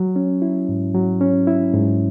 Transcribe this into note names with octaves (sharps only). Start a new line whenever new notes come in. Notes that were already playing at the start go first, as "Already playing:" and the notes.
Already playing: F#3
C#4
E4
G#2
F#3
C#4
E4
G#2